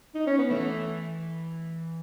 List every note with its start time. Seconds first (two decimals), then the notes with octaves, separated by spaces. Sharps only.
0.14 D#4
0.27 C#4
0.38 B3
0.50 E3 A3